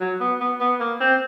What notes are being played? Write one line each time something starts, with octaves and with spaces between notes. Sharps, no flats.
F#3
B3
B3
B3
A#3
C4